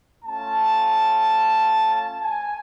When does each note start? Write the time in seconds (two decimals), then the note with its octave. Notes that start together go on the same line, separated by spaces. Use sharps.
0.24 A3 C#4 F4 A5
1.94 A5
2.23 G#5